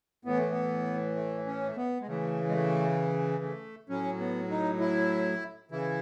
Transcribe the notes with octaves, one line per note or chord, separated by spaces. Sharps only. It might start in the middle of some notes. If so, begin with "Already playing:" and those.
A2 E3 B3
A3
B3
A3
C#4
A3
B3
G#3
C#3 E3 A3
G#3
A3
A3
A2 F#3 C#4
B3
D#4
E4
C#3 E3 E4